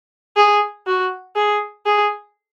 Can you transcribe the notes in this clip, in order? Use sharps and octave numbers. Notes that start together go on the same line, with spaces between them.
G#4
F#4
G#4
G#4